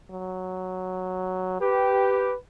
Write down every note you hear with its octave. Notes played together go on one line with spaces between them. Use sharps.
F#3
G4 B4